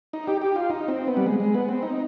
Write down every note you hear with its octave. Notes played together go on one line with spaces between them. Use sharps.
D#4
G4
G4
F4
D#4
C4
B3
G3
G#3
G#3
B3
C4
D#4